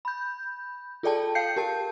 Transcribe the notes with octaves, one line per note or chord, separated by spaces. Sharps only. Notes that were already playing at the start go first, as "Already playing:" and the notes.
B5 G6
F4 G#4 A4 D5 G5 A5
F5 G5 G6 C7 C#7
G4 A#4 A5